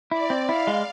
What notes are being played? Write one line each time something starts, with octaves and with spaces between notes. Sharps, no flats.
E4 D5
C4
E4 F5
G#3